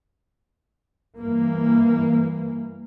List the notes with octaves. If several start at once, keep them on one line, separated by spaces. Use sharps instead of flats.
G2 E3 A#3